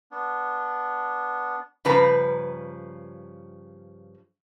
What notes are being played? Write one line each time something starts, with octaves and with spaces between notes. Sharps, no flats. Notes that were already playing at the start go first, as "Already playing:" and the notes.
B3 D4
G2 C#3 F3 B4 A#5